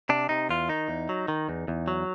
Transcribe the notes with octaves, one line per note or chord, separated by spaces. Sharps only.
C3 D4
C3 D#4
E2 F4
D#3 D#4
E2
F#3
D#3
E2
E2
F#3